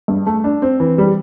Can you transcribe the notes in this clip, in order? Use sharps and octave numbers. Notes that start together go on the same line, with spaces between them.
G2
A3
D4
C4
E3
G3